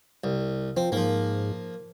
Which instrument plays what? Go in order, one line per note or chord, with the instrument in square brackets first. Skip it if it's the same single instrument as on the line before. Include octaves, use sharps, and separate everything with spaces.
[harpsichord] C2
[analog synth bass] F3 [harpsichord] C4
[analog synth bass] G#2 [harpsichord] F3 A#3